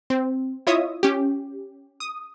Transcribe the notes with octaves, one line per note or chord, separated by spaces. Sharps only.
C4
E4 F4 C#5 D#5 E5 D#6
C#4 G4
D#6